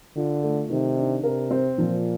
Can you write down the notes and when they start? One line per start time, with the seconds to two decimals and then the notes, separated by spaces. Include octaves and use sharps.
0.16 D3 F4
0.44 A3
0.70 C3 D#3
0.98 D4
1.23 C3 A#4
1.51 C4
1.78 A#2 F3